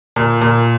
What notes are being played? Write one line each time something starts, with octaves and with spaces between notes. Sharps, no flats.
A#2
A#2